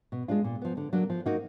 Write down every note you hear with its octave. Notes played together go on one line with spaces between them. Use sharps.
B2
G#3 D4 F4
A#2
F3 B3
D3
F#3 A#3 D4
F3
A#3 D#4 F#4